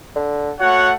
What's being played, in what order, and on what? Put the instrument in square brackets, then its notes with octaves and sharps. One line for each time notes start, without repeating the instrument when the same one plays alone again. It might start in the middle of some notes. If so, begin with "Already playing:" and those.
[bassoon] D3
[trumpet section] A3 C#5 F#5 [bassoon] F#4